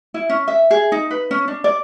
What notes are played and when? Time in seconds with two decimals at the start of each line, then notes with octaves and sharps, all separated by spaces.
0.14 E4
0.29 C#4
0.48 E5
0.71 G#4
0.92 D#4
1.11 B4
1.31 C#4
1.48 D4
1.64 D5